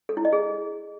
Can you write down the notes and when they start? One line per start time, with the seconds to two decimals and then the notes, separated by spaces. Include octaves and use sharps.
0.09 A4
0.17 E4
0.25 D#5
0.33 G#4